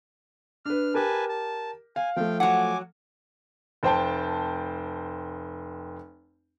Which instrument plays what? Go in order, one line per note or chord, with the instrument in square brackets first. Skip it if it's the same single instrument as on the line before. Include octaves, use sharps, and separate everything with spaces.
[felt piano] D4 B4 [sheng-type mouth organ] F6
[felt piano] G4 A#4 [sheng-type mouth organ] B4 G#5 A5
[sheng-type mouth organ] A5
[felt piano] F5 [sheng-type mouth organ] G#5
[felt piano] F3 A3 [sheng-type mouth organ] F5 G5
[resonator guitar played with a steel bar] F#3 F#5 [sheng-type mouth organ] G#5 D6
[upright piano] F1 C5 G5 A5